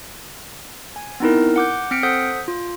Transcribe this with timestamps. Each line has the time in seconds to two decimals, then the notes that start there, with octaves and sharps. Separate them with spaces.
0.96 G#5
1.20 B3 C4 D#4 E4 A#4
1.56 F#5 D6 G6
1.91 C4 F6 B6 C#7 D7
2.03 A4 C5 F#5 D#6 G6 B6
2.48 F4